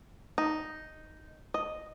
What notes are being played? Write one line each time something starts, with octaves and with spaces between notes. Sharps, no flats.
D#4
D#5